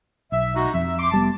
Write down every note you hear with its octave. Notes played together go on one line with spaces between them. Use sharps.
B1 E5
G#3 D#4 F#4
F2 E5
C6 D6
F1 G3 B3 A5